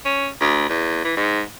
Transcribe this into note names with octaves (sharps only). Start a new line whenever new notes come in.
C#4
D2
E2
E3
G#2